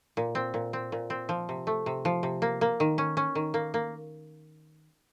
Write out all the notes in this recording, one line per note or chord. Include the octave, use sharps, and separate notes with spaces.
A#2
C4
A#2
C4
A#2
C4
F3
C3
A3
C3
F3
C3
A#3
A#3
D#3
C#4
C#4
D#3
A#3
A#3